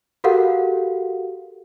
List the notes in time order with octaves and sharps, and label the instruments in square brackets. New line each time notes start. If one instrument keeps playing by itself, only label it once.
[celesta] F#4 G4 A4 A#4 F5 F#5